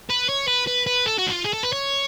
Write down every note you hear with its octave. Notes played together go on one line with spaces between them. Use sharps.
B4
C#5
B4
B4
B4
A4
F#4
D4
F4
G#4
A4
B4
C#5